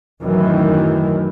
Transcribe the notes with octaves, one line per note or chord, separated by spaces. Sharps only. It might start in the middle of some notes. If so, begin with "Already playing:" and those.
F#2 A2 D#3 E3